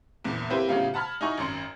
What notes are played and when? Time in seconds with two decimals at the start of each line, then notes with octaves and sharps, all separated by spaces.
0.24 F#1 E2 A#2
0.50 A#3 C4 E4 G4 B4 C5
0.68 A2 C#3 F#3 B3 F4 G4
0.94 F#5 A5 B5 F6 G#6
1.21 D#4 E4 F#4 G#5 C#6
1.37 G#1 F#2 C6 C#7